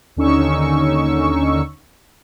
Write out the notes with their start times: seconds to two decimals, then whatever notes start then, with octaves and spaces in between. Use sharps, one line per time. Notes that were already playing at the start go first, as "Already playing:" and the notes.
0.17 D#2 D3 C#4 D#4 C#6 E6